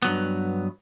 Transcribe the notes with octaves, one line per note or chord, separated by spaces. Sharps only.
G2 F#3 B3